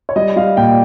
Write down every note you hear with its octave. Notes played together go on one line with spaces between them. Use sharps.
C#5
G3 D#5
G3 F5
A#2 G5